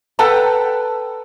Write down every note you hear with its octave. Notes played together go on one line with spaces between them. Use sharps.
A4 B4 F#5 G5 A5 A#5